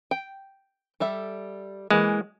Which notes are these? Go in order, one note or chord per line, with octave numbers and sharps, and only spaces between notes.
G5
G3 A4 E5
E3 G#3 A#3